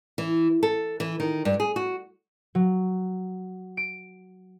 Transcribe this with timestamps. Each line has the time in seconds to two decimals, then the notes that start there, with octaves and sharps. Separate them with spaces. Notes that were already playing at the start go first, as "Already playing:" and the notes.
0.18 E3
0.63 A4
1.00 E3
1.20 D#3
1.45 G2
1.60 G#4
1.76 F#4
2.55 F#3
3.77 D7